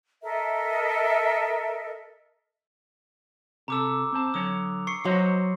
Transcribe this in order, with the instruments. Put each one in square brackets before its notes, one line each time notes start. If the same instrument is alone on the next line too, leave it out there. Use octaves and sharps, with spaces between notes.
[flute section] A4 A#4 D#5 E5
[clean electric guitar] C3 A4 [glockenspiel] A#5 D6 E6
[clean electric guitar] C4 C5 A5
[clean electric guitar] D3 F#3 C#5 [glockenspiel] D#6
[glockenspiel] C#6 C7 C#7
[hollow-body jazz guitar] F#3 [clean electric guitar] F#4 C5 D#5 [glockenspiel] C6